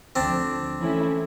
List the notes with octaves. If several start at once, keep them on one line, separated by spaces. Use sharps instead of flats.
D2 D3 F3 C4 D4
E3 A3 C#4 E4